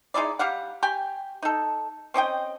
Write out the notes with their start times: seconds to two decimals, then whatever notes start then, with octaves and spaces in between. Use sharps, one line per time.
0.14 G#3 D#4 E4 D5
0.39 G3 G4 F5 F#5
0.83 G4 G5 G#5
1.42 D#4 A4
2.14 C4 C#4 D#5 G5